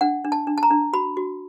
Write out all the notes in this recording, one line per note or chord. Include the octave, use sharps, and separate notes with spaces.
D4 F#5
D4
A5
D4
A5
A#5
D4
F#4 B5
F#4